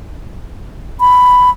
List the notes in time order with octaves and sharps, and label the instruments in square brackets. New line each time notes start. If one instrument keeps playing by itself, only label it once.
[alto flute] B5